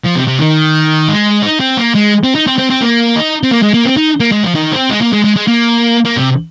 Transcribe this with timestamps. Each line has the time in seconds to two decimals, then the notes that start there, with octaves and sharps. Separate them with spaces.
0.04 F3
0.16 C3
0.27 C3
0.39 D#3
1.08 G#3
1.43 D#4
1.60 C4
1.77 A#3
1.95 G#3
2.24 C4
2.35 D#4
2.47 C4
2.58 C4
2.70 C4
2.82 A#3
3.16 D#4
3.43 C4
3.51 A#3
3.63 G#3
3.74 A#3
3.85 C4
3.97 D#4
4.20 A#3
4.32 G#3
4.44 F3
4.55 D#3
4.72 C4
4.90 G#3
5.01 A#3
5.12 G#3
5.24 G#3
5.36 G#3
5.48 A#3
6.05 A#3
6.17 C3